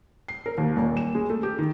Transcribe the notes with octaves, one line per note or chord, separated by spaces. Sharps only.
C7
A#4
D#2
D#1
E7
G#3
A3
G4
D#3